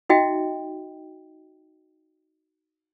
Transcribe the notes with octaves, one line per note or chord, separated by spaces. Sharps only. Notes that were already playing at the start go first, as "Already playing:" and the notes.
D#4 F#4 D#5 E5 G5